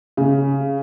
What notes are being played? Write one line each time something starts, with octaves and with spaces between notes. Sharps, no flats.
C#3